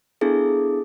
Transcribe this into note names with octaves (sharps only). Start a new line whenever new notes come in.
B3 D4 E4 G#4 A4